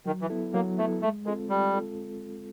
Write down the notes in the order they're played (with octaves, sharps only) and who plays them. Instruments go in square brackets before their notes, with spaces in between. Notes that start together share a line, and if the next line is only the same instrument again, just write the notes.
[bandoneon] D#3 [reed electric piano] F#3
[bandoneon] E3
[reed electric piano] B3 E4 A4
[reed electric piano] F#3 [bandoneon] A#3
[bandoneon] A3 [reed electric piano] B3 E4 A4
[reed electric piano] G#3 [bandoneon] A3
[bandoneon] G#3 [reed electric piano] C4 F4 A4
[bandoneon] G3 [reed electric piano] G#3
[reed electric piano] F4 A4